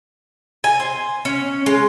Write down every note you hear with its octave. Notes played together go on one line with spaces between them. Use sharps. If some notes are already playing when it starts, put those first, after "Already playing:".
G#5
C5
C#4
G#3